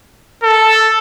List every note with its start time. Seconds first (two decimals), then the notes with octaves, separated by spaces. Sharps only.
0.44 A4